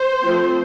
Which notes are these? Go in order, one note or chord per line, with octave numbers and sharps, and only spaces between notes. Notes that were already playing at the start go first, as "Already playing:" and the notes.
Already playing: C5
F3 A3 C4